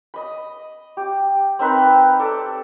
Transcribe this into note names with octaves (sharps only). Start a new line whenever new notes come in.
D#5 B5
G4
C4 D#4 A#4 B4
A4 D5